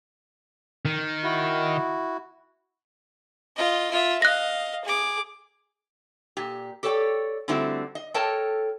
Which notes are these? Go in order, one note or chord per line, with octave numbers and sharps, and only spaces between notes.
D#3
E4 F#4
F4 D#5
F4 E5
D#5 F5 F#6 A#6
G#4 D6
A#2 G4
G4 A4 C#5 D5 G5
D3 G3 A3 C4 E4 F#4
D#5
A4 A#4 C#5 D#5 G5 A5